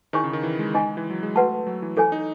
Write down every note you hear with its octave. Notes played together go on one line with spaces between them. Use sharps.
D#3 E4 G#4 C#5 G#5 C#6
C#3
D#3
E3
G#3
D#4 G#4 D#5 G#5
E3
F#3
G#3
A3 F#4 B4 F#5 A5
F#3
E3
E3 A4 C#5 G#5
D#4